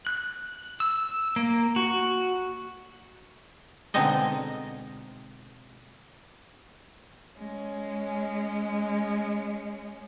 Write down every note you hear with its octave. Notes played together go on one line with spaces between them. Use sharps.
F#6
E6
A#3
F#4
B2 D3 G#3 C4 D#4 D#5
G#3 C#4